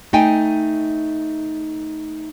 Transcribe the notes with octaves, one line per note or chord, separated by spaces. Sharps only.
A3 D#4 D#5 G5 G#5